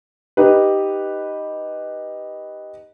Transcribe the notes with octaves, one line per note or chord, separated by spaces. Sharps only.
D#4 G4 B4